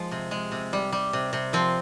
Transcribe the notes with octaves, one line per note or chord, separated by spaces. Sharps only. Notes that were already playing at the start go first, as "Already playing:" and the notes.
Already playing: F3 G#3
C3
G#3
C3
G3
G3
C3
C3
F3 C4